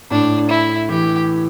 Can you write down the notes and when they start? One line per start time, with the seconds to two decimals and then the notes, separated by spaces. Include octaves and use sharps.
0.11 A2 D4
0.50 E4
0.89 E3 G4